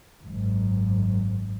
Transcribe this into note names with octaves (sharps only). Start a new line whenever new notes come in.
G#1 F#2